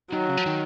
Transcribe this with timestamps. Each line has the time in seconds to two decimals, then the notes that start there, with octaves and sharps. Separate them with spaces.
0.12 D#3 F#3
0.29 C#3
0.38 F3
0.46 D#3